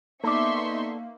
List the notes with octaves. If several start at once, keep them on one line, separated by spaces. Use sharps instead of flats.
A#3 B3 D#4 A4 D5 E5 C6 C#6